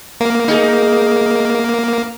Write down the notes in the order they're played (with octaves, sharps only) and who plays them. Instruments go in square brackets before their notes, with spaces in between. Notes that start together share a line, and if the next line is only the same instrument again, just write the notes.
[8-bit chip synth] A#3
[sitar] D#4 G#4